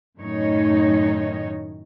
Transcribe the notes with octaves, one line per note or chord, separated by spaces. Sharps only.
F#2 A2 D#3 A3 D#4 C#5